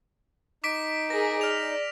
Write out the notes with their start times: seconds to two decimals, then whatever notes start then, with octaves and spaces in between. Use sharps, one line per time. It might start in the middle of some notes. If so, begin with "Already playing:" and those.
0.64 D#4 D6 B6 D7
1.10 G#4 A#4 A#6
1.41 D5 F6 F7